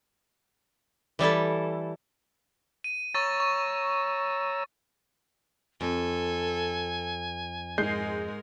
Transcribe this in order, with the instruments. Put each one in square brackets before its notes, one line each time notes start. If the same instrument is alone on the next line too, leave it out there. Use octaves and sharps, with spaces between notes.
[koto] E3 G3 E4 A4
[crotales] D#7
[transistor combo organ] C#5 A#5 E6 [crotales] C#6 A6
[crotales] C#6
[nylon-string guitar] F2 [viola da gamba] A4 [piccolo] G#5
[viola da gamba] G#2 A#4 [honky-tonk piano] G#3 G6 C7